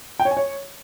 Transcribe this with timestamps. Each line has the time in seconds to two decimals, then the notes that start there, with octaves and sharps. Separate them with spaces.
0.20 G5
0.25 C#5
0.31 G#5
0.37 C#5